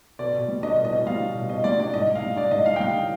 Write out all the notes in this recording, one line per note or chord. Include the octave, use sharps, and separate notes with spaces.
B2 D5
B2
G3
D4 D#5
B2
D#5
B2
G3 F5
D4
B2
B2 D#5
G3 D5
D4 D5
G#2 D#5
G#2
F5
G3
D4 D5
G#2 D#5
G#2 F5
G5
G3 F5
D4